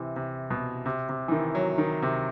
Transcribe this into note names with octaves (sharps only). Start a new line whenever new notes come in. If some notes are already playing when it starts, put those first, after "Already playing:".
Already playing: C3 E3
C3
B2
C3
C3
E3
D#3
F#3
D#3
C3